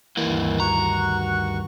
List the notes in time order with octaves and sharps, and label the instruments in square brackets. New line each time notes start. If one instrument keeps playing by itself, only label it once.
[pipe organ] D2 G2 D#3 [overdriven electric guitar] E3 A#3
[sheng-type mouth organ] F#4 F#5 C#6 [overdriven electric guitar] A#5